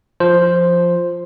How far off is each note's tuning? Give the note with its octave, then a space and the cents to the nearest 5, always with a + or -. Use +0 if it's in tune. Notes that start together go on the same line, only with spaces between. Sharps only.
F3 +0 C5 +0